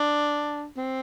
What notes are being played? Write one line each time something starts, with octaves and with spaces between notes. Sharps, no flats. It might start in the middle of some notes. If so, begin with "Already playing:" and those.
Already playing: D4
C4